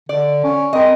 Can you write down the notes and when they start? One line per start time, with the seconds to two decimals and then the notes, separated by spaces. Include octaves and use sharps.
0.09 D3 D5
0.44 C#4
0.73 C4 A#4 D#5